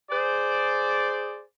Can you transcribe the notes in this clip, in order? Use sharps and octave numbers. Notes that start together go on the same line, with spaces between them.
G#4 C5 D5